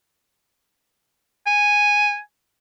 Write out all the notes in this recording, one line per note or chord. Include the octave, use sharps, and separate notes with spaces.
G#5